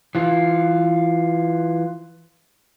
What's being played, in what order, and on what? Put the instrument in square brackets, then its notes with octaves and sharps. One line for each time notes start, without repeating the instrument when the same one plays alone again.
[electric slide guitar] E3 F4